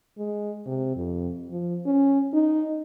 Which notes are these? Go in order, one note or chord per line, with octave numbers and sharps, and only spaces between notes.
G#3
C3
F2
F3
C#4
D#4